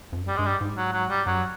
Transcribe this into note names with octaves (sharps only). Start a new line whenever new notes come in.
F2
F#2
G3
G2 G#3
G3
G#2
F#3
F#3
G3
F#2 F#3